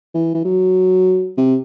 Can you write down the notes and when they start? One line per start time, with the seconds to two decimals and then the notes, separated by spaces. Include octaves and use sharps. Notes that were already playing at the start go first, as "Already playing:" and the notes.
0.14 E3
0.35 E3
0.45 F#3
1.37 C3